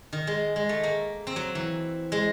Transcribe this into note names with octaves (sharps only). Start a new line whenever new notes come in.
D#3
G#3
G#3
A3
A#3
C4
F#3
E3
G#3